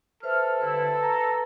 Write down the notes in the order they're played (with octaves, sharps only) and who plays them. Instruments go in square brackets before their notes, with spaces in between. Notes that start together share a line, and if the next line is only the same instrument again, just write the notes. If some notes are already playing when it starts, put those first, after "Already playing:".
[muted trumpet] A4 [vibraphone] B4 C5 E5 [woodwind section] F6
[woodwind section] G2 D3 E4 [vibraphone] B4 E6
[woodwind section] A#5